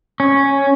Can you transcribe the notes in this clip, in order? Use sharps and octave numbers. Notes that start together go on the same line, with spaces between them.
C#4